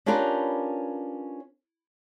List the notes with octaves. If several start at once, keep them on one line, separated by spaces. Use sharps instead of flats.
C#4 D4 F4 G4 A#4 B4